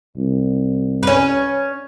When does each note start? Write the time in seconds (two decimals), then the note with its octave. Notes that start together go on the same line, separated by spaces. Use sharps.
0.17 C2
1.03 C#4 B4